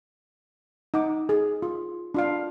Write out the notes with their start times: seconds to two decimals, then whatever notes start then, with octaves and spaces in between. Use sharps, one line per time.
0.94 D#4 F#5 D6
1.29 G#4
1.62 F4
2.14 D4 F4 F5